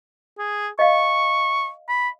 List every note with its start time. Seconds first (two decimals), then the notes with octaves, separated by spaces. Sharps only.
0.38 G#4
0.79 D#5 F5 C#6
1.89 B5